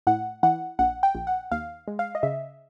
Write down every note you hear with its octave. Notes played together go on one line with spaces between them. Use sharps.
A2 F#5
E3 F#5
A#1 F#5
G5
A#1
F#5
D#2 F5
G#3
F5
D#5
C#3 E5